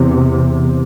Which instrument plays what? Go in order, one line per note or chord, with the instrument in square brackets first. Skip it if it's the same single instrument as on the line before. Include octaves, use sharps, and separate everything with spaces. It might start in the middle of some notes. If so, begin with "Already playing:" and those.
Already playing: [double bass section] E2 C3